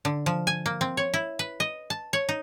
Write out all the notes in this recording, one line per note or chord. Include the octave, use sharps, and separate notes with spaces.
D3
F3
G#5
A#3
C4
C#5
E4
B4
D#5
A5
C#5
D#4